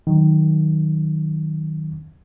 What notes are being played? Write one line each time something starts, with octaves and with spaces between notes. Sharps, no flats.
D#3 F#3